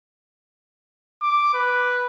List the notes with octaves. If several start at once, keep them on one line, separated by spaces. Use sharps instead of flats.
D6
B4